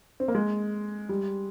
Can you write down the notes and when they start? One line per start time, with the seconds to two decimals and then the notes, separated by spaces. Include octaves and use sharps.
0.20 C4
0.28 A#3
0.35 G#3
1.09 G3